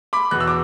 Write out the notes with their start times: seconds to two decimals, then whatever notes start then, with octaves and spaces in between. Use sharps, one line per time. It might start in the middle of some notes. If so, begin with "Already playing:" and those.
0.13 B5 D6
0.31 E2 B2 F#6
0.40 E6
0.48 D6